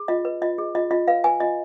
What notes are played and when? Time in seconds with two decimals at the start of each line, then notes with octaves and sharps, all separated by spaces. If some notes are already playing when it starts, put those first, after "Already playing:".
Already playing: G#4
0.08 F4 D#5
0.25 B4
0.42 F4 D#5
0.58 G#4
0.75 F4 D#5
0.91 F4 D#5
1.08 B4 F5
1.24 B4 G#5
1.40 F4 D#5